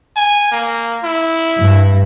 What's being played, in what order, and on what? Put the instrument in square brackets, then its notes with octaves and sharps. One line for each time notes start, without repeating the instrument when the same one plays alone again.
[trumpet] G#5
A#3
E4
[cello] G2